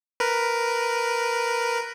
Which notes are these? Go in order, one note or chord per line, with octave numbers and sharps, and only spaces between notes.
A#4 B4